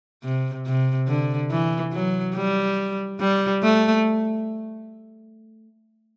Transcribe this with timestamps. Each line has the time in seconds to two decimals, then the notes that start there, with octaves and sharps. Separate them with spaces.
0.24 C3
0.66 C3
1.08 D3
1.51 E3
1.93 F#3
2.36 G3
3.20 G3
3.63 A3